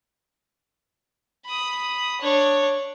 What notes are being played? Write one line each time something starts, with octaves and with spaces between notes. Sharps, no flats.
B5 D#6
D4 C#5